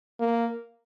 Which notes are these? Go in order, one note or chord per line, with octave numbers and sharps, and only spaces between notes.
A#3